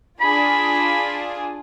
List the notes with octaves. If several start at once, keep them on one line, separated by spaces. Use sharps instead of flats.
D4 F4 G#4 B5